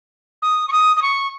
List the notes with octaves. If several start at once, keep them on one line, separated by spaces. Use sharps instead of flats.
D#6
C#6
D#6
D#6
C#6